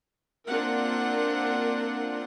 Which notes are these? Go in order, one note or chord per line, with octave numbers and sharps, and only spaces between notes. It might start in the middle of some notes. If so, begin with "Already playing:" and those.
A#3 C4 D4 F4 A#4 F#5